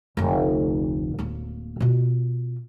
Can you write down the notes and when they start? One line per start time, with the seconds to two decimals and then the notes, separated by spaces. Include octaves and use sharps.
0.17 F1 D2
1.19 D1 A#3
1.80 B2 F4